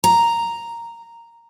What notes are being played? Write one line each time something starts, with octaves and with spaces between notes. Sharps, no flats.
A#5